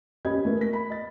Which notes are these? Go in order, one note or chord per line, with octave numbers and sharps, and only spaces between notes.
A#3 C#4 G4 D#5 B5 G#6
A3 A#4
B6
B5
D#5 A6